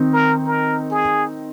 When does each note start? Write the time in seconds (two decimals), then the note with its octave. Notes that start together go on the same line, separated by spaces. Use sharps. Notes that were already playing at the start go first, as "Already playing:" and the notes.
Already playing: D#3 C4 D#4
0.13 A#4
0.45 A#4
0.91 G#4